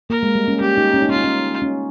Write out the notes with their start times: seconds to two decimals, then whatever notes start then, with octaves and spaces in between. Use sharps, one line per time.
0.10 A#3 A#4
0.23 G#3
0.35 G3
0.48 C#4
0.61 C#4 G4
0.77 D#4
0.94 C#4
1.02 D#4
1.09 C#4 F4
1.16 D#4
1.24 C#4
1.62 C#4